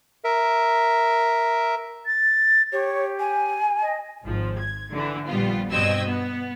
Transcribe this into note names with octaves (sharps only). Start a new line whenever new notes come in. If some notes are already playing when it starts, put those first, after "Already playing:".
A#4 E5
A6
G4 C#5
G#5
D#5
G#1 F3
G#6
D3 E3
A#1 G3 B3 F4
G2 B2 C4 D#5 E6 G#6
B3